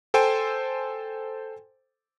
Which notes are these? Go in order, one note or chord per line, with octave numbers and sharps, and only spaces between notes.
A4 C5 G5 G#5 C6